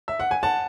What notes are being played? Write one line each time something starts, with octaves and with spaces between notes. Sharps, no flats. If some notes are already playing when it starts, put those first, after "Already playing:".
E5
F#5
G#5
F#5 A5